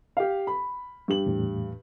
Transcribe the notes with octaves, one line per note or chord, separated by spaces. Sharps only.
G4 F5
B5
G2 G4 F#7
E2 A2